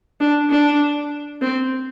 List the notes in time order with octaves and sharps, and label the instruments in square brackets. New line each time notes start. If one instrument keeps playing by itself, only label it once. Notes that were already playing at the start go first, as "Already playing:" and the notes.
[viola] D4
D4
C4